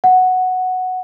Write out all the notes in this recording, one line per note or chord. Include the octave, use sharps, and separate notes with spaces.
F#5